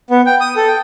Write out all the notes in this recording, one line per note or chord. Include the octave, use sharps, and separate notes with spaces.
B3
G5
D#6
A4
G5